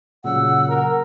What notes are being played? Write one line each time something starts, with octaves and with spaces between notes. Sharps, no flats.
A#2 C#3 F#3 F#5 E6
A#4